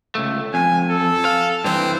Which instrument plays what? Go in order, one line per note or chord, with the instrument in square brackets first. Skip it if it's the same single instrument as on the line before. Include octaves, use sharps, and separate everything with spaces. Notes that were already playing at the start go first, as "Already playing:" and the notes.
[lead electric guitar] C#2 A3
[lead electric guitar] F2 [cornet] G#5
[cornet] A4
[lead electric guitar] F5
[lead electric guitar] G2 E3 [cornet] C4